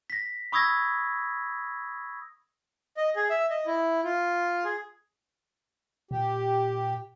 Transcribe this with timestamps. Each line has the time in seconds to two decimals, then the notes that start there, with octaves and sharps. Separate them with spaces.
0.10 A#6 B6
0.52 B5 C#6 D#6 E6 G#6 A#6
2.97 D#5
3.16 G#4
3.30 E5
3.50 D#5
3.66 E4
4.04 F4
4.65 G#4
6.11 A#2 G4